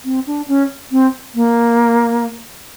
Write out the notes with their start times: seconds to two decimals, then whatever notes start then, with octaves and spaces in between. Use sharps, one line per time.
0.05 C4
0.27 D4
0.48 C#4
0.92 C4
1.35 A#3